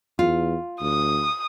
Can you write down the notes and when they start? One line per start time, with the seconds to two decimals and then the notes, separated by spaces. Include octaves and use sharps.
0.19 E2 F4
0.82 D2 D#6